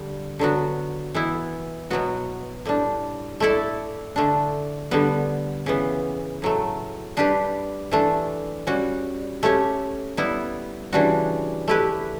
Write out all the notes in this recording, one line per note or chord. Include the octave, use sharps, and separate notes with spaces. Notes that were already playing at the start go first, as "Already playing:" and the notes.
Already playing: D3 G3
D3 F#3 B3 F#4
E3 B3 E4
B2 F#3 B3 F#4
A2 G3 D4
A3 E4 A4 D5
D3 A3 D4
D3 G3 B3
C#3 E3 B3
A2 F#3 A3
G3 D4 G4 B4
E3 A3 D4
G3 C#4 F#4
A3 C#4 G4 C#5
G3 B3 E4
C#3 E3 G3 D4 F#4
A3 E4 G4 B4